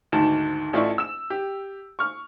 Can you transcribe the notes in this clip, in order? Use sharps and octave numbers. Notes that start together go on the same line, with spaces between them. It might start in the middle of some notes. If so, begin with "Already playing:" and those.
D2 G#2 D#3 A5 E7
A1 A3 E4 F4 D5 C#6
E6 E7
G4
C#6 F6